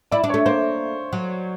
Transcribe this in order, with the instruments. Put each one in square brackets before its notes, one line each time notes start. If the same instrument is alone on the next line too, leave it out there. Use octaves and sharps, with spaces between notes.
[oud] E4 [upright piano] D5
[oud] D4
[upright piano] C#5
[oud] A3
[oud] A#3 [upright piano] C5
[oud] F#3